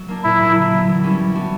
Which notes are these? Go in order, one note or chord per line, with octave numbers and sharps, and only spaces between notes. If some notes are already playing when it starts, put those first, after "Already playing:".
Already playing: F#3
A#3 D4
A#2 E4
F#3 A#3 D4
D3
F#3 B3
E3
G3 C#4 E4
G3
B3 D4 F#4